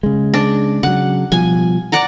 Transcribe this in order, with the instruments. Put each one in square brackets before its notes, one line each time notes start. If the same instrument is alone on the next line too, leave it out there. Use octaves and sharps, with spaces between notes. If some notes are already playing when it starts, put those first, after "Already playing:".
[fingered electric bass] C#3 G#3
[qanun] D4
[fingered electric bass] C#3 F#3 [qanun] F#5
[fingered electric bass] B2 F3 G3 [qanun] G#5
[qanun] D5 F#5 A#5